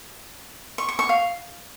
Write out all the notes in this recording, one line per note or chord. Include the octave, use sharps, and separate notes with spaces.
C#6
C#6
C#6
F5